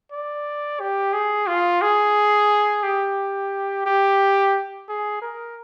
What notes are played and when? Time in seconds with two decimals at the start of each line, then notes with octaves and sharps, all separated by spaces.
0.12 D5
0.80 G4
1.13 G#4
1.47 F4
1.81 G#4
2.83 G4
3.86 G4
4.89 G#4
5.22 A#4